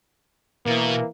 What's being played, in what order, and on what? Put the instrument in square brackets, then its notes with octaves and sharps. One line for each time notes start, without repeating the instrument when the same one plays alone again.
[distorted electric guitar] B2 [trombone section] E3 A#3